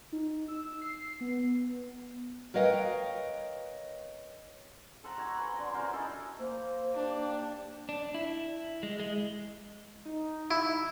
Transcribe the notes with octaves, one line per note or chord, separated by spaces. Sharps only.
D#4
E6
C7
B3
A#4 B4 C#5 D#5 F5 G5
A4 C5 F#5 A#5
F#4 G#5 A#5
B4 F#5 C6
D3 F#3
C#4 F#4 A#4 C5
E4 A4 D#5
A#3 C5
D4 G4
D4
E4
G#3
G#3
D#4
E4